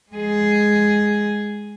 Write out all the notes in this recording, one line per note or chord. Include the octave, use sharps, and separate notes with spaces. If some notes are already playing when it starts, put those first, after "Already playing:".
G#3 G#4